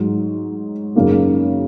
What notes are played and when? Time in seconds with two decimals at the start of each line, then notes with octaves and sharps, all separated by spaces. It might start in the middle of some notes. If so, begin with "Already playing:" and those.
Already playing: G#2 F#3 D#4
0.95 F#2 C#3 A#3 D#4